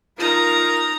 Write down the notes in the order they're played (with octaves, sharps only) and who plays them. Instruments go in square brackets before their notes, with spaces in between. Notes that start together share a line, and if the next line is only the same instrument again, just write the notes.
[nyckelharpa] D#4 A#5 [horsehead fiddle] F4 A#4